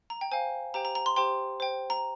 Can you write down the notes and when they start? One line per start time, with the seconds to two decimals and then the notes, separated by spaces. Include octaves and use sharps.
0.10 A#5
0.21 G5
0.32 C5 F5 G#5
0.74 G4 C5 G5 A#5
0.85 A#5
0.95 A#5
1.06 C6
1.16 G4 C5 G5 C6
1.60 C5 G5
1.90 A#5